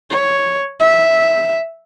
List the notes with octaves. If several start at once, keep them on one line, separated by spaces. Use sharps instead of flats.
C#5
E5